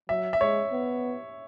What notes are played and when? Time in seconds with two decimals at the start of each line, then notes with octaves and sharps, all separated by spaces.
0.09 F#3 E5
0.33 E5
0.41 G#3 C#5
0.72 B3